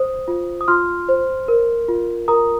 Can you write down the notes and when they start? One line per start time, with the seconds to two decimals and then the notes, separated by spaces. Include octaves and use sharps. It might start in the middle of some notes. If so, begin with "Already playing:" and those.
Already playing: C5 D#6
0.28 F4
0.61 D#6
0.68 F4 C6 F6
1.09 C5
1.48 A#4
1.89 F4
2.28 A#4 A#5 D#6